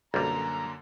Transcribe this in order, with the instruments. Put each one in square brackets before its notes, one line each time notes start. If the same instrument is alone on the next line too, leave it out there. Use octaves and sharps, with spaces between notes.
[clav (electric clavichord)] B1 G3 [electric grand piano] F#2 D3 A#3 [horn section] A#5